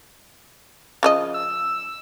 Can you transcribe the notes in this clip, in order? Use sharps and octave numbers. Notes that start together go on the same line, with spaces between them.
C#3 F3 D#5
E6